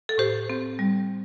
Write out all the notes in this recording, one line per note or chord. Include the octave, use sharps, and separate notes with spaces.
A4
A2 G4 C5
C4
G3